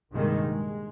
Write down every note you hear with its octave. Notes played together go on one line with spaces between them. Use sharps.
A#1 G2 C3 D#3 G#3
G#3